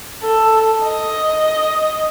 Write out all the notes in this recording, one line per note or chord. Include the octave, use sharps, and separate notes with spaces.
A4
D#5